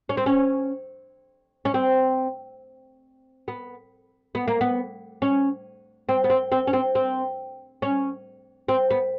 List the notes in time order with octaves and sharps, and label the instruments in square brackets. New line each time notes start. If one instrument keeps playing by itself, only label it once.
[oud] C#4
C4
C#4
C#4
C4
B3
B3
A#3
B3
C#4
C4
B3
C4
C4
C#4
C4
C4
C#4
C4
B3